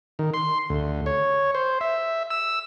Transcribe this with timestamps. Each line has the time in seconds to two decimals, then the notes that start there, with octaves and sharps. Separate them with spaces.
0.19 D#3
0.34 C6
0.70 D2
1.06 C#5
1.55 C5
1.81 E5
2.31 E6